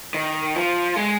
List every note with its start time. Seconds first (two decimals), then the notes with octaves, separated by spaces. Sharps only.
0.14 D#3
0.56 F3
0.96 G#3